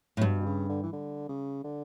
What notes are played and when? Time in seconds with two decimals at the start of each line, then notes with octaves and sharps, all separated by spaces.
0.17 A2
0.21 G2 B2
0.40 B2
0.46 C#3
0.69 D3
0.83 E3
0.93 D3
1.28 C#3
1.64 D3